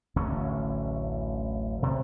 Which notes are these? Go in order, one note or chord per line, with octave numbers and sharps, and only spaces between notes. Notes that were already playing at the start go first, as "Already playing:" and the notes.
D1 A1 D3 C#4
C3